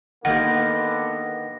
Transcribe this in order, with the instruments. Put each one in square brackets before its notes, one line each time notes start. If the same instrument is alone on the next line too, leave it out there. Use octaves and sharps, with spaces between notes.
[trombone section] D3 B3 [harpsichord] D#3 A#3 G4 [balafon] F#5 [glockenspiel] A#6